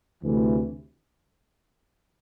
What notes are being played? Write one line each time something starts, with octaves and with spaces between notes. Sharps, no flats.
D2 C3 E3 A3